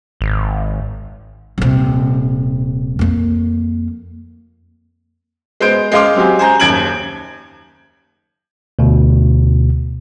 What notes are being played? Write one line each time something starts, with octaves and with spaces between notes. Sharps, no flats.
G#1
D#1 C3
F2 A#3
G#3 B3 C5 G6 D7
G#3 D#5 F5 C6 D6
F#3 C4 G4 G#5
C5 G#5 A#5 G6
F#1 D#2 G#6 D7 F#7
D2 B2